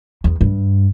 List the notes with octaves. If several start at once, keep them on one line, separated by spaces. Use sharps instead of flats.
E2
G2